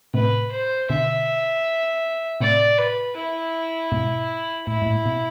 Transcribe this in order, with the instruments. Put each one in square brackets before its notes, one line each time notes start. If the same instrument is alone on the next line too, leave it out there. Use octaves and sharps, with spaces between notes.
[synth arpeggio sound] A2 C3 [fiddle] B4
[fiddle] C5
[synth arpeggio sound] B2 D3 [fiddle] E5
[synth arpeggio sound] A2 C3 [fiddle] D5
[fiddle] B4
E4
[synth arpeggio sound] G#2 B2
[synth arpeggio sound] A2 [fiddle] E4
[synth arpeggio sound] G#2
A2
B2